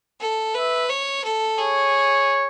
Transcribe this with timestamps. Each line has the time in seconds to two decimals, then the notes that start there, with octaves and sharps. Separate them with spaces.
0.21 A4
0.55 B4 E5
0.90 C#5
1.25 A4
1.58 G#4 C#5